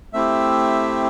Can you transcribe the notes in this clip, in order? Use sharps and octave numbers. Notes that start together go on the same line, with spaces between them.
A3 C4 E4 G4 E5